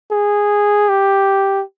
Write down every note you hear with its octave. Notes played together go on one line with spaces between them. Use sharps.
G#4
G4